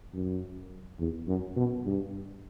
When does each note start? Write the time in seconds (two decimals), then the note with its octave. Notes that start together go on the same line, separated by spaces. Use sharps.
0.14 F#2
0.99 E2
1.28 F#2
1.56 B2
1.85 G2